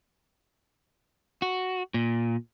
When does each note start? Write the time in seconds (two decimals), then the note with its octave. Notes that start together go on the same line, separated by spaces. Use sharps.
1.42 F#4
1.94 A#2